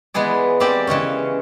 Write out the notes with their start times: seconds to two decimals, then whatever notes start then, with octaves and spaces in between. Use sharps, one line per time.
0.14 E3 G#3 B3 G#4 D5
0.60 A#3 C4 G4 D5 G5
0.87 C#3 E3 G#3 C#4